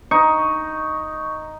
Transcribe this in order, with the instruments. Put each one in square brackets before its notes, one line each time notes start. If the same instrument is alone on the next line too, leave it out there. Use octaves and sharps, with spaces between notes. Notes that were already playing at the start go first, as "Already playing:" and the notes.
[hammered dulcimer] D#4 [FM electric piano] C#6